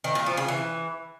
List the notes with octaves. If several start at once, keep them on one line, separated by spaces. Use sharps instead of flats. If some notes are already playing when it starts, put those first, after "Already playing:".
D#3
A#2
F3
C#3
E3